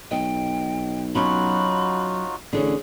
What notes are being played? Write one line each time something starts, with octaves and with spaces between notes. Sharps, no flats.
B1 D#5 G5
F#3 C#4 D#4 F4 F#4 B5
A1 D3 C#4 G#4